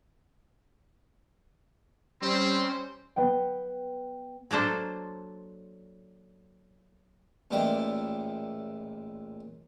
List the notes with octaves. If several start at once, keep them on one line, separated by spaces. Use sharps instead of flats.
G3 C4 C#4 C5
B3 G5
F#3 A#3 D4 A4 C5
A1 A#2 G#3 E4 D5 G5